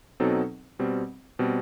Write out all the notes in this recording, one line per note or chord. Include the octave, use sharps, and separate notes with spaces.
B2 F#3 C4 D#4 A4
B2 G3 C4
B2 G3 C4